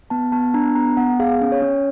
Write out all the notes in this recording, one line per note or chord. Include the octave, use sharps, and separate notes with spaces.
B3 A5
B3 A5
D4 A#5
B3 A#5
B3 F#5
G#4 F5
C#4
C#5
C#4